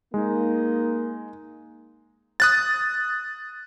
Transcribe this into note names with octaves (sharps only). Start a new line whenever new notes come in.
G#3 A#3 D#4
D#6 F#6 A6